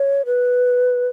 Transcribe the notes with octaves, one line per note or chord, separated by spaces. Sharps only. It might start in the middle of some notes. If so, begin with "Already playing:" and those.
Already playing: C#5
B4